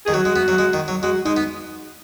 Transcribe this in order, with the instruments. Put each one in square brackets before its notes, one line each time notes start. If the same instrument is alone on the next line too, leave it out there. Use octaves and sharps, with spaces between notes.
[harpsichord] D#3 [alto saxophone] G#4
[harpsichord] F#3 [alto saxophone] F#4
[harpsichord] G#3
B3
F#3
G#3
D#3
F#3
[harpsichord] G#3 [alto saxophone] F#4
[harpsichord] G#3 [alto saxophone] D#4
[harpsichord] B3